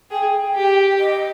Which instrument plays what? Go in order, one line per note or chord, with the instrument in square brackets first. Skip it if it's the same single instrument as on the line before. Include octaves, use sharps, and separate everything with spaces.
[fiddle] G#4 [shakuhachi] G5
[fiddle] G4
[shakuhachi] D#5